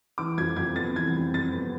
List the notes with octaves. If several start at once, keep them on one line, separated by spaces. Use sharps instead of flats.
E3 D6
F2 G#6
F2 G#6
B3 A6
E3 G#6
F2
F2 A6
B3